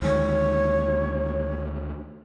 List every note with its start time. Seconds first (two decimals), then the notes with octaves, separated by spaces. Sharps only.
0.02 D2 D#3 G#3 C#5